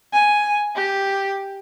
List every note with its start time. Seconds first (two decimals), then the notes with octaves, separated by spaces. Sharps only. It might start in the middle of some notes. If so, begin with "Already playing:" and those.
0.12 G#5
0.76 G4